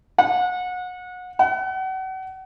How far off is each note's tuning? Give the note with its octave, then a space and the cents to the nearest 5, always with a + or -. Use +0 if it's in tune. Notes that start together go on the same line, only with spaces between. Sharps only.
F#5 -30
F#5 +35